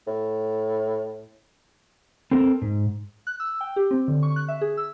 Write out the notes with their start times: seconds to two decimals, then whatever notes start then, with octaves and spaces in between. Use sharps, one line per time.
0.07 A2
2.31 C4 A4 A#4
2.62 G#2
3.27 F#6
3.40 E6
3.61 G5
3.76 G4
3.91 C4
4.08 D3
4.23 C#6
4.36 F#6
4.48 E5
4.61 G#4
4.77 E6